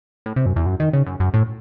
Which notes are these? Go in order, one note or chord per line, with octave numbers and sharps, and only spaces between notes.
A2
C3
F#2
E2
F#2
D#3
C#3
F#2
F#2
A2